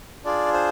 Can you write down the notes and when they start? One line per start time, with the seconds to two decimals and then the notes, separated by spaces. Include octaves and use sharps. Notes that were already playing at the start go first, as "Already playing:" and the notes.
0.25 D4 F4 G#4 D5
0.53 C5